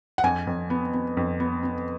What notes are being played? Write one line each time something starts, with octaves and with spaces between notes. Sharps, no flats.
F#5
F2 G#5
F2
B3
B3
F2
B3
B3